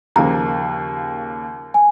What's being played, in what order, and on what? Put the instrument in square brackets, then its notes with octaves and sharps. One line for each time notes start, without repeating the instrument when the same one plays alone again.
[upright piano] D#2 C#3 F3 A#3 [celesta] A#5
[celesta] G#5